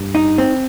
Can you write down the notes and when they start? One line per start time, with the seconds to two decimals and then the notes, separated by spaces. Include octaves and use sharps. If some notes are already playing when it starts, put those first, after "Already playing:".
Already playing: G2
0.15 D#4
0.38 C4